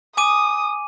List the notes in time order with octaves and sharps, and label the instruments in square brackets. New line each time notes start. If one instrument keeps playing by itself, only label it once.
[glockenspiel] G#5 D6 D#7 [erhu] D#6